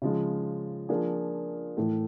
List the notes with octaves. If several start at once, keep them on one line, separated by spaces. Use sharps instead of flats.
C#3 F3 G#3
F3 A#3 D4 F4 G#4
A2 E3 A3